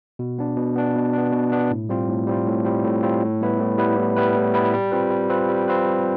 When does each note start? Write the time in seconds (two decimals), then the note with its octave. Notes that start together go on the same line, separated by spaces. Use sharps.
0.19 B2
0.39 B3 D4
0.56 B2
0.76 B3 D4
0.95 B2
1.13 B3 D4
1.33 B2
1.52 B3 D4
1.71 A2
1.89 G3 C4 F4
2.09 A2
2.27 G3 C4 F4
2.47 A2
2.65 G3 C4 F4
2.84 A2
3.03 G3 C4 F4
3.22 A2
3.41 G3 B3 E4 B4
3.60 A2
3.78 G3 B3 E4 B4
3.97 A2
4.17 G3 B3 E4 B4
4.36 A2
4.54 G3 B3 E4 B4
4.73 G3
4.92 C4 F4 B4
5.11 G3
5.30 C4 F4 B4
5.49 G3
5.68 C4 F4 B4
5.86 G3